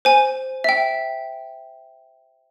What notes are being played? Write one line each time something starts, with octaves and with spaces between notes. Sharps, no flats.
C5 G#5
E5 G5